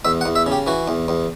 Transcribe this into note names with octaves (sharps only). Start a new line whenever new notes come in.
E2 E5
F#5
E2
E5
C#3
G4
E3 F#4
E2
E2